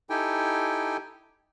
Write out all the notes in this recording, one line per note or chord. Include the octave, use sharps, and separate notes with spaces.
D#4 E4 G4 A4 G5 G#5